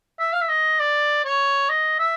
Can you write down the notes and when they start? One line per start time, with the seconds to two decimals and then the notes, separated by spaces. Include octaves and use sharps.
0.19 E5
0.33 F5
0.41 E5
0.49 D#5
0.80 D5
1.25 C#5
1.69 D#5
1.99 E5